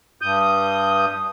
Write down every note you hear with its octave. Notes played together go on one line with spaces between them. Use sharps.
G2 D#6 G6